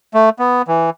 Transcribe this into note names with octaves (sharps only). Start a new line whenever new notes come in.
A3
B3
E3